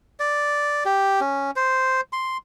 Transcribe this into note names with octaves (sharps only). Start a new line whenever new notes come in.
D5
G4
C#4
C5
C6